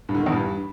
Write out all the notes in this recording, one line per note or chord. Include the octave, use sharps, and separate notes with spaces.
G2
D3
D#3
E2
G2